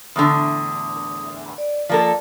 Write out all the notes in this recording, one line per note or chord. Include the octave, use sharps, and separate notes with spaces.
E2 A2 D3 D#6
D5
F3 A#3 A4 D5 A5